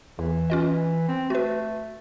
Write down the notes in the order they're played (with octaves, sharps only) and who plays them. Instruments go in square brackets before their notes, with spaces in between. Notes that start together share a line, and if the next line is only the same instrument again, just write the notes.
[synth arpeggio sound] E2 [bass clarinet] E3
[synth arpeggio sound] C#4 F4 D#5
[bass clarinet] C4
[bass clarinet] A3 [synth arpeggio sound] F#4 B4